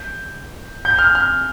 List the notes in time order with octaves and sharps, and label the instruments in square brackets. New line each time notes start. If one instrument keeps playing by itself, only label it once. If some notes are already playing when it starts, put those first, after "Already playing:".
Already playing: [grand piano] G6
G6
F6
F6